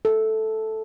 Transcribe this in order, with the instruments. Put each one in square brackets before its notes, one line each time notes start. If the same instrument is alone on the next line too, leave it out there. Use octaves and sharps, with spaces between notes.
[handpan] A4